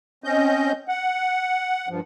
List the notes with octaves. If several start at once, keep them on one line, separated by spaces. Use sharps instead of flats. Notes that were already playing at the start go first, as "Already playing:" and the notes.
C4 C#4 D#5 G6
F#5
G2 F3